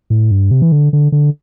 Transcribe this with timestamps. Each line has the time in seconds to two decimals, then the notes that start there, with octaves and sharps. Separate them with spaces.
0.10 A2
0.31 G2
0.51 C3
0.62 E3
0.72 D3
0.93 D3
1.12 D3